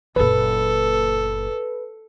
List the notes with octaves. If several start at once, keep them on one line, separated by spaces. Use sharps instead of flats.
F#1 A#2 A4 B4